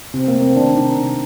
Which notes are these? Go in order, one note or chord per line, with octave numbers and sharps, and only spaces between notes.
C3 C4
A#3
A3
C4
D#3 D4
C3 D#4
C3